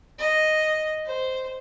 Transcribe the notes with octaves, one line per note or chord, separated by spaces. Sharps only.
D#5
C5